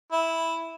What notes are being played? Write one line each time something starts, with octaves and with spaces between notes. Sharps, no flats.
E4